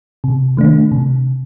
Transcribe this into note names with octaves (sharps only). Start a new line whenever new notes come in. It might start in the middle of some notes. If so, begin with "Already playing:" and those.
C3
D#3 A3 D4
C3